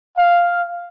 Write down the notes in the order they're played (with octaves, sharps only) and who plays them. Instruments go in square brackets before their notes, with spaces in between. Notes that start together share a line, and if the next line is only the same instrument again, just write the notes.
[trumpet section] F5